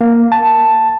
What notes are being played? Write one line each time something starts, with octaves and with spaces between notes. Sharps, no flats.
A#3
A5